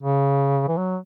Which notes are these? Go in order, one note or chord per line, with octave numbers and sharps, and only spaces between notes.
C#3
E3
F#3